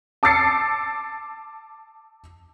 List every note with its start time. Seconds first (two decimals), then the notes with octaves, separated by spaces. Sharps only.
0.23 A5 D6 E6 A6 C7 C#7